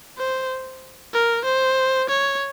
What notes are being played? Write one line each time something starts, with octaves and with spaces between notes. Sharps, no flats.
C5
A#4
C5
C#5